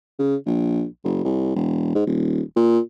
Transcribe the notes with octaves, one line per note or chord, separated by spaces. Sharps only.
C#3
A#1
F#1
C2
E1
G#2
D#1
A#2